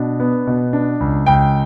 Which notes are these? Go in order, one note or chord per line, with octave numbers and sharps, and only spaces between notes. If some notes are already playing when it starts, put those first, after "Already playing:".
Already playing: B2 D4
B3
B2
D4
C#2
C#2 G5